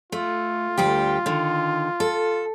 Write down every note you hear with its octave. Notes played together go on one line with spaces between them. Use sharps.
A3 F4
D2 G3 G4
D3 D#3
A4